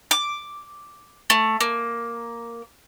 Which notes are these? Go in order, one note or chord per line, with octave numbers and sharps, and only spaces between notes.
D6
A3
A#3